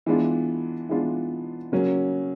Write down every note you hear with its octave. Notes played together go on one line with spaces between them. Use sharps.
E3 G#3 B3 D4 F4
E3 G#3 B3 D4 F4
C#3 F#3 A#3 C#4